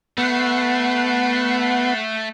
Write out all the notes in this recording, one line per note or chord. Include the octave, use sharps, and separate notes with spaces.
A3 B3 F#5 C7